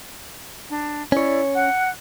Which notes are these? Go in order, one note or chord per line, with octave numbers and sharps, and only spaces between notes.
D4
C#4 E4 C#5 D5
F#5 F#6